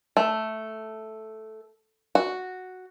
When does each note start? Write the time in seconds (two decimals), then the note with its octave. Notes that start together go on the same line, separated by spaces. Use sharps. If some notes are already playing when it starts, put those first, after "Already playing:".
0.17 A3
2.15 F#4